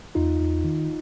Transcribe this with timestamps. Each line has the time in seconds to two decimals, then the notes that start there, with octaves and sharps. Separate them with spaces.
0.15 E2 D#4 F4
0.40 E2
0.64 D#3